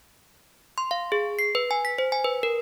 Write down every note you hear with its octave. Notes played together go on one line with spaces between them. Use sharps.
C6
F5
G#4
C7
B4
G#5
B6
C5
G#5
B4
A#4